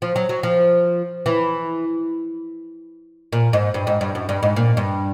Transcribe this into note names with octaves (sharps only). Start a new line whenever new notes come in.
F3
F#3
F#3
F3
E3
A#2
G#2
G2
G#2
G2
F#2
G2
G#2
A#2
G2